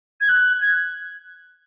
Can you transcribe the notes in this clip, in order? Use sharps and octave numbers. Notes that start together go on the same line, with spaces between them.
G#6
F#6
G#6